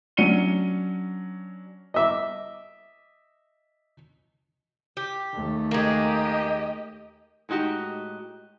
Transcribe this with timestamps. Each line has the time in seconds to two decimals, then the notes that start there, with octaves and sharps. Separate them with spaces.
0.17 F#3 C#4 D4 C#7 D#7 G7
1.94 D#5 E5 D6
4.97 G4
5.33 D#2 A3
5.71 G#3 A#3 G4 D#5
7.49 A2 G#3 D#4 F#4 G4